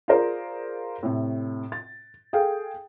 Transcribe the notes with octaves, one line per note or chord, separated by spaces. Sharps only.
F4 G#4 A#4 C5 D5
A2 C3
A6
G#4 A4 F5 G5